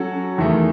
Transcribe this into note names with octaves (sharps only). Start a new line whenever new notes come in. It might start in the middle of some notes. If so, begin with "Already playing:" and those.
Already playing: F#3 C#4 F#4 A4
E2 D#3 A3